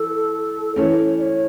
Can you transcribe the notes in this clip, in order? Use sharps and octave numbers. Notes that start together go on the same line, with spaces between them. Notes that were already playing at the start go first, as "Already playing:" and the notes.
Already playing: E3 A4
E3 A3 C#4 C#5
D5
C#5